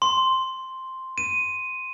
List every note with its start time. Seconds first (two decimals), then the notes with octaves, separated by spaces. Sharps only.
0.02 C6
1.18 D#7